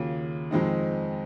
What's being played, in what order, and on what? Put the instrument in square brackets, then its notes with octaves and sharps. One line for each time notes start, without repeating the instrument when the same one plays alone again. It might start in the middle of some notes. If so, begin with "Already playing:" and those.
Already playing: [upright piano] D#2 C#3 F#3 A#3 F4
F2 D#3 G#3 C4 D#4